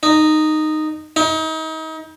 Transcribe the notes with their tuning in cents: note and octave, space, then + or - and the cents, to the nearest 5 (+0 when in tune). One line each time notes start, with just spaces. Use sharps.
D#4 -10
D#4 +35